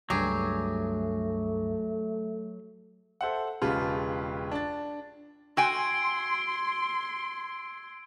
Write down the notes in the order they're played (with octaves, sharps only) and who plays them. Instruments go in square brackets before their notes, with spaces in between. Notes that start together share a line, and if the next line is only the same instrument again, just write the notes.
[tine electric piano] C#2 G2 [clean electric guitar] F#3 [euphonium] A3 [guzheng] G4 G#4
[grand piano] A4 C5 E5 F#5
E1 C#3 F4 G4 B4 A5
D4 A6
[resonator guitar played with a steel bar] F#4 G5 G#5 [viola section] C6 [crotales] E6 G#6 D7